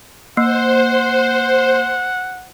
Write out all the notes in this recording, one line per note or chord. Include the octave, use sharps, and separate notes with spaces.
A#3 C5 F#5